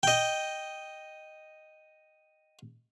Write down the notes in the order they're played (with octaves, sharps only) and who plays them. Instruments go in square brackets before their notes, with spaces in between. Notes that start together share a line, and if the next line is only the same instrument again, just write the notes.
[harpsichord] D#5 G5